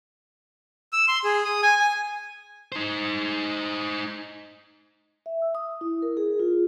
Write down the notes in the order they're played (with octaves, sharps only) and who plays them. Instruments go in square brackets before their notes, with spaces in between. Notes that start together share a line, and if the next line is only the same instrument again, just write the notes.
[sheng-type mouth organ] E6
C6
G#4
D#6
G#5
G#5
[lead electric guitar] D#4 C5
[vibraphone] E5
E6
D#6
E4
A#4
G#4
F4